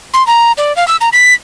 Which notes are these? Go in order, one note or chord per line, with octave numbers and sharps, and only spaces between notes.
C6
A#5
D5
F5
E6
A#5
B6